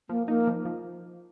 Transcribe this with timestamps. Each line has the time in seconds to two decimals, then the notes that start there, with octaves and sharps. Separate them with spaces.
0.09 F3 A#3
0.28 A#3 D#4
0.47 F3
0.65 F3